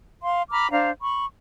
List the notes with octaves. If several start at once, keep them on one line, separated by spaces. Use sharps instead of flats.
F5 C6
A#5 B5 D6 F6
D4 C5 F5 A#5
B5 C#6